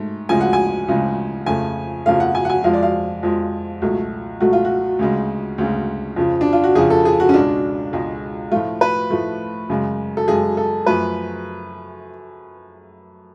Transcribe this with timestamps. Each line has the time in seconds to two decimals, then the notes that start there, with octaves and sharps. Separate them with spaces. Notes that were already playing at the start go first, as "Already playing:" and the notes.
Already playing: G#2 A3
0.29 D2 C#3 F3 G#3 G#5
0.41 F#5
0.53 G#5
0.88 D2 C#3 F3 G#3
1.46 F2 C#3 F3 A3 G#5
2.06 F2 C#3 F3 A3 F5
2.20 F#5
2.35 G#5
2.45 F#5
2.50 G#5
2.64 F2 F3 G#3 F5
2.73 D5
2.83 F5
3.23 F2 F3 G#3
3.82 C#2 B2 F#3 A3
4.40 C#2 B2 F#3 A3 F#4
4.53 F4
4.65 F#4
4.99 D2 C#3 G#3
5.58 D2 C#3 G#3
6.16 F2 C#3 F3
6.41 D4
6.53 F4
6.64 F#4
6.75 F2 C#3 F3 G#4
6.90 A4
7.05 G#4
7.20 F#4
7.29 C#4
7.34 C#2 B2 G#3 D4
7.93 C#2 B2 G#3
8.52 A2 F3 A3 F4
8.81 B4
9.10 A2 F3 A3
9.70 F#2 C#3 G#3
10.17 A4
10.28 F#2 C#3 G#3 G#4
10.57 A4
10.86 F#2 F3 A3 B4